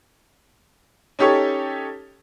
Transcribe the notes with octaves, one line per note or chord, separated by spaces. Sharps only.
C#4 D#4 G4 A4 C#5